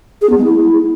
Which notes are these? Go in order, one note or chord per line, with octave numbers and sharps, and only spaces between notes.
G#4
B3
G#3
E4